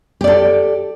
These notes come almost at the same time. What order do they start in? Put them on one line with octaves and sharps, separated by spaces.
G4 D5 A4